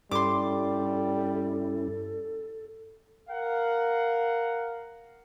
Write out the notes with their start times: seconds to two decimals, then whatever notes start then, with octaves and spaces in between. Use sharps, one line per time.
0.11 G2 G3 C#4 E4 A4 C6 D6
3.30 A#4 F5 F#5